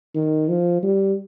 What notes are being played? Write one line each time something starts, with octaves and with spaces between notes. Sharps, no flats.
D#3
F3
G3